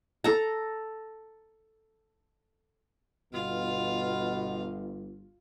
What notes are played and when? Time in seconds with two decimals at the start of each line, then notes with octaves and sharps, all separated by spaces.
0.24 A4 A#5
3.33 G1 B2 F4 F5